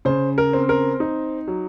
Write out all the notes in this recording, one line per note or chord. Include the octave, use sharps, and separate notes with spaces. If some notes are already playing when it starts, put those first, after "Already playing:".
C#3 C5
A#4
C4
A#4
D#4
F#3